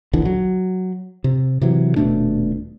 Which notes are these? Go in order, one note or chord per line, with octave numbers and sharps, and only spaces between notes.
A#1 D#2 D3 E3
F#3
C3
C3 E3 F#3
D#1 B2 A3 D4